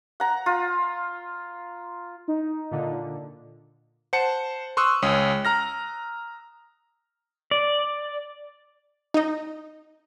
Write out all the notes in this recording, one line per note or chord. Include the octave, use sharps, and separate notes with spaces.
F#5 A#5
F4
D#4
A#2 D3
C5 F#5 A5 C#7
C6 C#6 D#6 E6 F#6
C#2 C#4 D#6
A#5 F6 A#6
D5
D#4 D#5